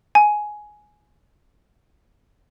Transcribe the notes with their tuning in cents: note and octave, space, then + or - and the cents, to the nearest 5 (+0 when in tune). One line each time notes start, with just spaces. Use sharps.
G#5 +10